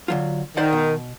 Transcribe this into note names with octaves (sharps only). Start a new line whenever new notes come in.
D3 F#3 F4
D#3 C5 D5 F#5
B2